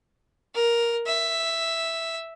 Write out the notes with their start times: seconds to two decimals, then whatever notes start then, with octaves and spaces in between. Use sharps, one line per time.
0.55 A#4
1.07 E5